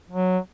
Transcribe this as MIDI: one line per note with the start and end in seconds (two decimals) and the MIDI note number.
0.11 0.38 54